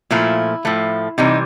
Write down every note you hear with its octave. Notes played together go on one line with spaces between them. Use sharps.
A#2 F3 A3 E4
A2 F3 A3
C3 E3 G3 D#4